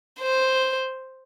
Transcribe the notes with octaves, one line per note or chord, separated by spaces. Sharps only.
C5